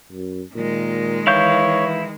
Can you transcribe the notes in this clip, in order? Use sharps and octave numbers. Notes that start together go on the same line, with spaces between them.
F#2
A#2 D#3 G#3
E3 E4 C#5 F5 G6